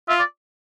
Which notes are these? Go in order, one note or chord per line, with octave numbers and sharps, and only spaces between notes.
F4 E5
D5